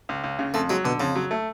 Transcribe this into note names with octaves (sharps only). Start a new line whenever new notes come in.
C#2
C#2
C#3
F2 A3
F#3 G#3
B2 D3
F2 C#3
F#3
A3